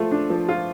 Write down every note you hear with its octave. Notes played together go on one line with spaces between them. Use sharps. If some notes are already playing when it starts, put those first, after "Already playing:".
Already playing: F3 A3 F4
D4
F3
F4